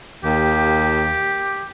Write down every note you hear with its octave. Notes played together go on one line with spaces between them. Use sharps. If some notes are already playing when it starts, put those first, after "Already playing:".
D#2 G4